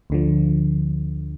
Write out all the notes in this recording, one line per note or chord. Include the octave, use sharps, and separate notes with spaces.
D2 D3 F3